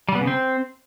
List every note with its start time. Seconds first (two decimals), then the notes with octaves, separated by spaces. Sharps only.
0.09 G3
0.15 B3
0.21 C#3
0.27 C4